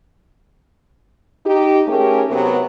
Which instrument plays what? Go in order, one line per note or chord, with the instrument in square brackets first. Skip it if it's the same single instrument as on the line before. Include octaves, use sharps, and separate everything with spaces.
[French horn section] D#4 G4
A3 C#4 G4 G#4 A#4
C3 F#3 B3